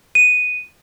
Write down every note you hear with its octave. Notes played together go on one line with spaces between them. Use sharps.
D#7